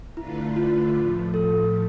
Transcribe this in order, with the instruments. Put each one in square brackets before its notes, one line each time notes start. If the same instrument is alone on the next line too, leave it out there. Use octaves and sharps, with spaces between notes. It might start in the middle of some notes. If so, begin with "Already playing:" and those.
[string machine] D3 A3 D4 F4 B4 [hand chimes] E4
[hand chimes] F4
[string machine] A2 F3 A3
[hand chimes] A4